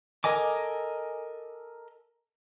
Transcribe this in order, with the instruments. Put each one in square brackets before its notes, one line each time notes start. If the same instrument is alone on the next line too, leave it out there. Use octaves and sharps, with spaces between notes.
[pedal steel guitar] A4 A#4 D#5 G#5 D6